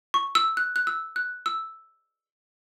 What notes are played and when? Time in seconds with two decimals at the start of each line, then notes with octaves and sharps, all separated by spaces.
0.14 C#6
0.35 E6
0.57 F#6
0.76 F#6
0.87 E6
1.16 F#6
1.46 E6